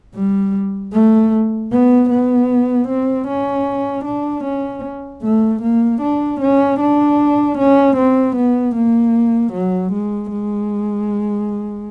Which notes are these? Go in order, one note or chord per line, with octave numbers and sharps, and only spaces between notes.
G3
A3
B3
B3
C4
C#4
D4
C#4
A3
A#3
D4
C#4
D4
C#4
C4
B3
A#3
F#3
G#3
G#3